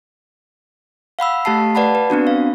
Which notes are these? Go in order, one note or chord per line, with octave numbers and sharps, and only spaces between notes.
F5 F#5 B5 E6
A3 G4 F5 A5 C7
B4 D5 F#5 A5 B5
B4
B3 C4 D4 F#4
F5